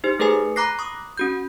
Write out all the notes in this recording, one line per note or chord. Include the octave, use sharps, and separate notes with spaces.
D#4 G4 C5
A3 G#4 A#4 B4 G#5
A#5 B5 D6 F#6 A#6 C7
C#6 D#6
C#4 F#4 G6